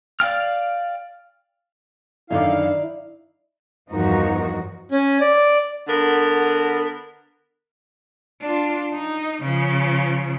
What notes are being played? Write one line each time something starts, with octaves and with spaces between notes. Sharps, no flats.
D5 F5 G5 F6
F#2 D3 D#3 D#4 E4 D5 F5
E2 G2 F3 D#4 F#4 A#4
C#4
D5
D3 B3 A#4
D4 F4
D#4
C#3 F3